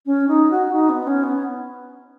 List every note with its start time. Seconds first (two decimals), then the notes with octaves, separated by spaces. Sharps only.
0.05 C#4
0.27 D#4
0.50 F#4
0.72 D#4
0.89 B3
1.07 C#4
1.23 B3